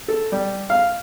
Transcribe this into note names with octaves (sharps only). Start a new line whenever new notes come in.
A4
G3
F5